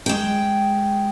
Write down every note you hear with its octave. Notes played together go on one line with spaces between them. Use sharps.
G#3 G5